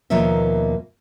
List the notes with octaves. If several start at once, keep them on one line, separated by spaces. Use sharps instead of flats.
D#2 B2 F3 A#3 C#5 E5